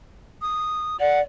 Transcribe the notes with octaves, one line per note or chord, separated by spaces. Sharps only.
D#6
D5 F#5